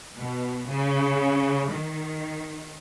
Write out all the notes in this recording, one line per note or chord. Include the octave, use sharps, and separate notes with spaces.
B2
C#3
D#3